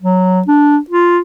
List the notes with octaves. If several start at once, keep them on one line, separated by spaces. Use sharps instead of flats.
F#3
D4
F4